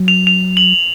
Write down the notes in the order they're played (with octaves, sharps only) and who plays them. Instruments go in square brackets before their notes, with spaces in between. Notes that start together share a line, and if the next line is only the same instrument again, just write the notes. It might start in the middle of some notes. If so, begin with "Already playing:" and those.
Already playing: [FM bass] F#3
[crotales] F7
F7
F#7